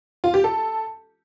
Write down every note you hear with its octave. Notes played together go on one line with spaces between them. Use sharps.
F4
G4
A4